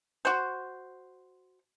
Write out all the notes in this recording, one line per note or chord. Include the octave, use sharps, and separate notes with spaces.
F#4 C5